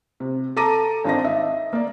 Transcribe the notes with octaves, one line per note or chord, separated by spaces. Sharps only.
C3
A4 A5 A#5 D6 A#6 D#7
G#1 C4 D4 D#4 A#6
D#5 E5
A#3 D5